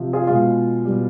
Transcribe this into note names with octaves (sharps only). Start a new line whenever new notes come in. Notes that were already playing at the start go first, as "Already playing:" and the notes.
Already playing: C3 F3
F4 G#4
B2 G#3 F4
B2 G3